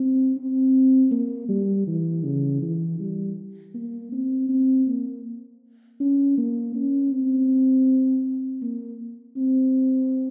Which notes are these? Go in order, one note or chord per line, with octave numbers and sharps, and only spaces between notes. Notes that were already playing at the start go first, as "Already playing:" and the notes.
Already playing: C4
C4
A#3
G3
E3
C#3
E3
G3
A#3
C4
C4
A#3
C#4
A#3
C#4
C4
A#3
C4